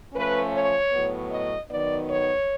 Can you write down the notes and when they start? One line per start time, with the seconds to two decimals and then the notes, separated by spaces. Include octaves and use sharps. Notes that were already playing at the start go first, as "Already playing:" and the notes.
0.13 F3 A3 C#4 B4
0.52 C#5
0.92 A2 F#3 B3
1.31 D#5
1.70 D#3 F#3 B3 D#4 D5
2.08 C#5